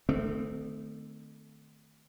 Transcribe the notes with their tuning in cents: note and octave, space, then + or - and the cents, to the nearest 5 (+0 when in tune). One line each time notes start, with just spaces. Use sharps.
D#3 -40 A3 +0 C4 -30